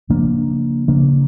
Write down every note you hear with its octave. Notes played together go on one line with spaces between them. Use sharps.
C#3 F3 A#3 D4
C#3 F3 A#3 D4